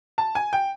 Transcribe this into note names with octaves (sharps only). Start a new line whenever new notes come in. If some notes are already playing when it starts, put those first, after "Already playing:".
A5
G#5
G5